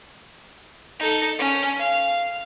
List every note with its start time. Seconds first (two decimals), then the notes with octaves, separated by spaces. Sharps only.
0.99 D#4 A4
1.39 C#4
1.78 F5